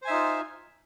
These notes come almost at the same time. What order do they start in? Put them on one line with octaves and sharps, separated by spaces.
C5 G#5 E5 D#4 F4